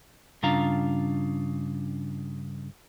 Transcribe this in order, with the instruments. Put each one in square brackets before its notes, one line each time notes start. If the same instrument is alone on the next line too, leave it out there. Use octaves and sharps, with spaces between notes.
[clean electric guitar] G2 C#3 D4 F4 F5 A#5